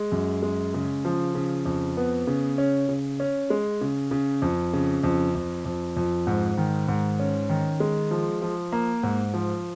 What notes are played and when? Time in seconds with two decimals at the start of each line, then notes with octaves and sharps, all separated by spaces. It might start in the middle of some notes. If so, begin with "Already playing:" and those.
Already playing: G#3
0.12 F#2
0.43 G#3
0.74 C#3
1.05 F3
1.35 C#3
1.65 F2
1.97 B3
2.27 C#3
2.58 C#4
2.89 C#3
3.20 C#4
3.50 G#3
3.81 C#3
4.11 C#3
4.42 F2
4.73 C#3
5.03 F2
5.35 F2
5.65 F2
5.97 F2
6.27 G#2
6.57 D#3
6.88 G#2
7.19 C#4
7.49 D#3
7.80 G#3
8.11 F3
8.42 F3
8.72 A#3
9.03 G#2
9.34 F3